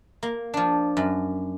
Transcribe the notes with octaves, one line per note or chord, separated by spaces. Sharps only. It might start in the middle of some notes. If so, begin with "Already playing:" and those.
A#3
F3 D4
F#2